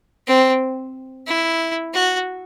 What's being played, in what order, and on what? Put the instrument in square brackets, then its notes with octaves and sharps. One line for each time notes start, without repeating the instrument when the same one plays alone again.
[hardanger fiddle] C4
E4
F#4